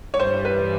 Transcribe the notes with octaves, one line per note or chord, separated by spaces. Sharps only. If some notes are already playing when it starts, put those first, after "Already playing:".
C#5
G2 E3 G3 C5
B4